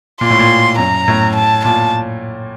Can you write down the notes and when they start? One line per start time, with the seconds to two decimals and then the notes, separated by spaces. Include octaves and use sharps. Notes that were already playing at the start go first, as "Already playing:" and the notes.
0.21 A#2 C6
0.30 A2
0.39 A#2
0.78 F#2 A#5
1.08 A2
1.36 A5
1.65 A#2 A5